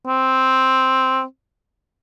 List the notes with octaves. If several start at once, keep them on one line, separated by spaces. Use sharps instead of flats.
C4